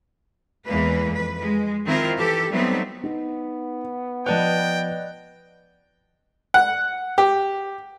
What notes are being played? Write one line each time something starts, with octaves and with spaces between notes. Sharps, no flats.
E2 E3 G#3 A#3 B4
F2 B4
G#3
D#3 C4 E4 F4 A#4
E3 G4 A4
F#3 G3 A3 B3 C4 D#4
B3 D#4
F3 B4 D5 D#5 G5 A5 F#6
F#5
G4